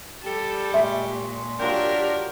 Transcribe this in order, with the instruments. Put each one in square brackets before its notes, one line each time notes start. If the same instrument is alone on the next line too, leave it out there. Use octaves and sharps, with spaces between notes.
[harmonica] G3 G4 [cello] A4
[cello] A#2 [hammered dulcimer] G#3 C#6 [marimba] E5
[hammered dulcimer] F#3 F4 G5 [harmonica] D4 [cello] G4 A#4